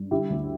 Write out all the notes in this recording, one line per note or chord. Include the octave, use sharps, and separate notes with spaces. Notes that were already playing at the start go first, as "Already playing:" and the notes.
Already playing: G2
D3 E4 G4
D2